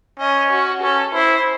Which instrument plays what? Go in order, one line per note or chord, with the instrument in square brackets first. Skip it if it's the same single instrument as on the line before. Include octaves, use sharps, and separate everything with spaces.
[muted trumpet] C#4 [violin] D#5
[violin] F#4
[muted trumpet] C#4 [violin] A4
[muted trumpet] E4 [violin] C5